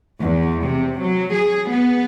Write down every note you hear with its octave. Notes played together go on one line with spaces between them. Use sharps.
E2
C3
F#3
G#4
B3